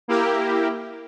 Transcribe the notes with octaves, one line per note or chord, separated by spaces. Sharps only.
A#3 E4 G4 A#4